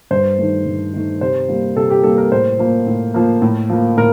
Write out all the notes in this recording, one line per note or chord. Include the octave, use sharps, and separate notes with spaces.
G2 C5
D#3 A3
G2
D#3 A3
C3 C5
G3 A#3
C3 A4
G4
G3 A#3 A4
A#4
A2 C5
F3 A#3
A2
F3 A#3
A2
F3 A#3
A2 A#4